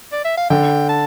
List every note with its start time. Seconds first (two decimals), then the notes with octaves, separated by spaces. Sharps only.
0.12 D5
0.24 E5
0.37 F5
0.50 D3 G5
0.89 A5